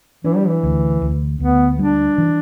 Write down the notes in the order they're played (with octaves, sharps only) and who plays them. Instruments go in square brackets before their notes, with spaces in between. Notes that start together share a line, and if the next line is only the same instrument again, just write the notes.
[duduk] E3 [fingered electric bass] D4
[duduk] G3
E3
[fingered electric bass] D2
D2
[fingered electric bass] D2 [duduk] B3
[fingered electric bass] G3 [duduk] D4
[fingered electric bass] E3